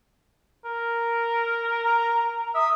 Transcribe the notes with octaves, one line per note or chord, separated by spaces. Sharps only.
A#4
A#5
E5 D#6